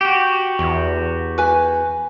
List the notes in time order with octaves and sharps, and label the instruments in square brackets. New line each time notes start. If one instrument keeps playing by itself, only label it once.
[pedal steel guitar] F#4 G4
[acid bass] E2
[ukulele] B4 G#5